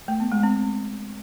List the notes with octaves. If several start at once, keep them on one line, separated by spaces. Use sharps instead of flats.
A3
B3
G#3
C4